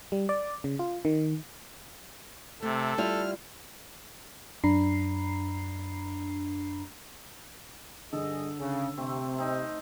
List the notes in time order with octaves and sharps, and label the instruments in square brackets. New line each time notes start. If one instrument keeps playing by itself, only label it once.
[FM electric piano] G3
D5
C#3
F4
D#3
[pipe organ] C3 [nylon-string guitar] A3 [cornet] A4
[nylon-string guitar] G3 E4 F4 [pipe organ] F6
[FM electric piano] F#2 D4 A#5 B5 C7
[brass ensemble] G2 G#4 D#5 [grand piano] D3 [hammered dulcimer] A4
[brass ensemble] C#3
[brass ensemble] C3 [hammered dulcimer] A3 C4
[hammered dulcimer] C4 D#4